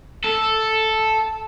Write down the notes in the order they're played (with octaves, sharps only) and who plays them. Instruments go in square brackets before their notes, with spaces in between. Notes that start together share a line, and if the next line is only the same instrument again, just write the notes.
[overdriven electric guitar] A4